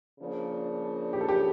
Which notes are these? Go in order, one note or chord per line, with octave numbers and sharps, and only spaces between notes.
C#3 F3 A#3 D4
G4
A4
G4